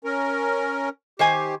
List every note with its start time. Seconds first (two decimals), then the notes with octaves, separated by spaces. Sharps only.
0.05 C#4 A#4
1.19 D#3 G4 C5 G#5